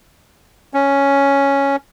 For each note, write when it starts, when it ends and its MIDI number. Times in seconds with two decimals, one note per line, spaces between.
0.74 1.76 61